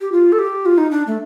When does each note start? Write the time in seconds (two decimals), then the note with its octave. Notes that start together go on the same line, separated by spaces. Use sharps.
0.01 G4
0.12 F4
0.32 A4
0.39 G4
0.66 F4
0.78 D#4
0.91 D4
1.07 A3